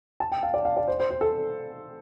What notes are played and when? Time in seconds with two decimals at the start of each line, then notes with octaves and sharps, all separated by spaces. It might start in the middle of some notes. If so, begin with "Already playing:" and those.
0.20 A5
0.32 G5
0.43 F5
0.54 D5
0.65 F5
0.77 D5
0.88 C5
1.00 C5
1.11 C5
1.21 A4